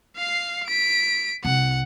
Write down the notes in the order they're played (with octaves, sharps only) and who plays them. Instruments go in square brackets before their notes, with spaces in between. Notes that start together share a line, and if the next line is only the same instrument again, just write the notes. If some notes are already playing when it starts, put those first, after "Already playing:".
[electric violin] F5 C7
B6 D7
[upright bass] C2 [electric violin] F#5